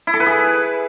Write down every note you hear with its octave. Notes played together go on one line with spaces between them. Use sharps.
E4
A4
B4
G#4